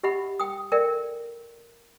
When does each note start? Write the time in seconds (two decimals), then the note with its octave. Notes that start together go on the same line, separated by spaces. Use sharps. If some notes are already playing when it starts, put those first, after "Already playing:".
0.03 G4 D#5 E5 F#5 B5
0.40 G5 D#6
0.72 A4 A#4 D5 E5 G5